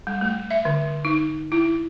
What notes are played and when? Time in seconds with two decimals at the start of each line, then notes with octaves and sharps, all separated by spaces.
0.07 G3
0.21 A3
0.51 E5
0.65 D3
1.05 D#4
1.52 E4